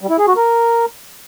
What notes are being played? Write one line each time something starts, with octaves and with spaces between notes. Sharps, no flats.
G3
E4
G#4
F#4
A#4